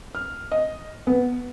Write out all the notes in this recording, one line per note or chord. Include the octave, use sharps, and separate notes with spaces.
F6
D#5
B3